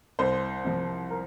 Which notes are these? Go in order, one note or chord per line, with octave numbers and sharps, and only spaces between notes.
C2 C5
C3 F3
A#4